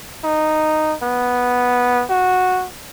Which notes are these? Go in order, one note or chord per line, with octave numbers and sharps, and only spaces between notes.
D#4
B3
F#4